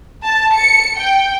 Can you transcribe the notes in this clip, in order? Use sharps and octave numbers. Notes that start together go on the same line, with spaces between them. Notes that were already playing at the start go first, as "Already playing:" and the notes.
A5
C#7
G5